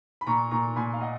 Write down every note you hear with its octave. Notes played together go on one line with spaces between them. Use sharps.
B5
A#2 A#5 C#6
A#2 A#5 C#6
A#2 G#5 B5
F5
D#5 F#5